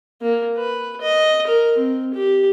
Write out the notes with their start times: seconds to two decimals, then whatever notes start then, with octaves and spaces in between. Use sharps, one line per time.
0.22 A#3
0.57 B4
1.01 D#5
1.47 A#4
1.77 C4
2.14 G4